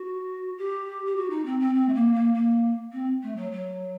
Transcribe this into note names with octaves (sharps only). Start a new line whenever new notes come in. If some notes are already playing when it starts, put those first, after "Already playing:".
Already playing: F#4
G4
G4
F#4
D#4
C4
C4
C4
A3
A#3
A#3
A#3
C4
A3
F#3
F#3